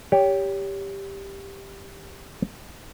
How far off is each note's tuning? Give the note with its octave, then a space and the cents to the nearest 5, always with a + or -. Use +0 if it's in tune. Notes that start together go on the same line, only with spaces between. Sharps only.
G4 +5 C#5 +30